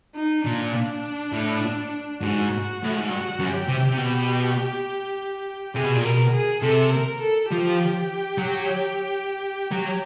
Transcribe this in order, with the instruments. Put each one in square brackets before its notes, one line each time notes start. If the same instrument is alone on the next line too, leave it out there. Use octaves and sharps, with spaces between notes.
[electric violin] D#4
[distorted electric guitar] A#2 [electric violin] D4
[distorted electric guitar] A2
[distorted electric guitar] G#2 [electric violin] F#4
[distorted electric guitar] A2
G#2
[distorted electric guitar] G2 [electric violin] F#4
[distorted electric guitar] F#2
[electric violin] G4
[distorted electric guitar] C3
C3
B2
[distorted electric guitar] C3 [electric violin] G#4
[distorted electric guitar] B2
A#2
[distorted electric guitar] B2 [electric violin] A#4
[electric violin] G#4
[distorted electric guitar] C3 [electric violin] A4
[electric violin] A#4
A4
[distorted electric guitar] F3 [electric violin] G4
[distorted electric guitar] F#3
F#3